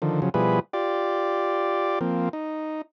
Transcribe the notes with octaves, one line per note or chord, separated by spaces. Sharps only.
D3 D#3 F3
C#3 F3 F#3
B2 F3 G3 E4 G#4 B4
F4 G4 D5
F3 A#3 C4
D#4